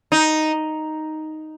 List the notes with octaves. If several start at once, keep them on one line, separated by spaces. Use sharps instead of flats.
D#4